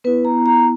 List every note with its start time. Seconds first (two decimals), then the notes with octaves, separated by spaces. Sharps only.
0.04 B3 E4 B4
0.25 A#5
0.46 A#5